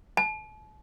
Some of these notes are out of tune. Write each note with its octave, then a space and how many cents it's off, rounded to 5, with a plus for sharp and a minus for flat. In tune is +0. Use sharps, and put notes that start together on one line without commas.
A5 -40